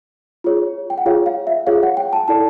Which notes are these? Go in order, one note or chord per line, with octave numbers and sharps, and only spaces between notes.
F4 G#4 C#5
G5
F#5
F4 G#4 C#5 F5
F5
E5
F4 G#4 C#5 F5
F#5
G5
A5
E4 A4 D5 A5